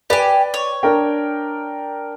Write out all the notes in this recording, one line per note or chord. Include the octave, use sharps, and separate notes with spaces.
G4 B4 D5 G#5
C#5
D4 A#4 G5